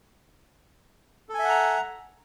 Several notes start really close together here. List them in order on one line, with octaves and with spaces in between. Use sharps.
A4 G#5 E5 F#5 A#5